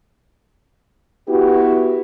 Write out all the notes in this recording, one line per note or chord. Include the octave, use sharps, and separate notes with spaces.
B3 E4 F#4 G4